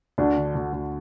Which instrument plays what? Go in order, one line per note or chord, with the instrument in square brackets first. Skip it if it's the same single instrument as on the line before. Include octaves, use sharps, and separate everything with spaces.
[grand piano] D2 [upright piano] D4
[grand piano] D3
D2
D2